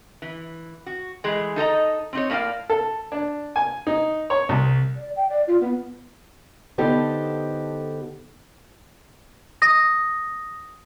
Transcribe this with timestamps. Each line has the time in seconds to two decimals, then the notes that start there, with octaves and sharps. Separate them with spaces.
0.22 E3
0.86 F#4
1.24 E3 G#3 A3 G#4
1.56 D#4 A4 D#5 A#5
2.13 C4 D#4 C#5
2.30 A2 A#3 E4 D5 F5
2.70 A4
3.12 D4
3.56 G#5
3.87 D#4
4.30 C#5
4.49 C2
4.97 D5
5.16 G5
5.29 D5
5.47 F4
5.61 B3
6.78 D3 B3 D#4 G4 A4 C5
9.62 D#6 A#6